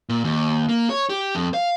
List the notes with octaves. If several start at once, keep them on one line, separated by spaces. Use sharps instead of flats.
A#2
D#2
A#3
C#5
G4
F2
F5